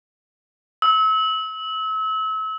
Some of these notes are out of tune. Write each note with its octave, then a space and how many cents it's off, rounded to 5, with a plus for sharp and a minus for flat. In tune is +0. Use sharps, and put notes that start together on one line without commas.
E6 -35